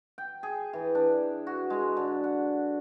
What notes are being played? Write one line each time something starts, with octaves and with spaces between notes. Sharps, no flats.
G5
G#4
E3
D4
F#4
G#3
D3
F#5